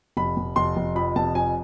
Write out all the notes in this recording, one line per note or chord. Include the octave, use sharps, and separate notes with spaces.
F1 B5
F1
F1 C6
F1
F2 B5
F1 A5
F2 G#5